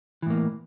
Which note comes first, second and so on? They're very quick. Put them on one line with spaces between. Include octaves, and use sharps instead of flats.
E3 A2 A#3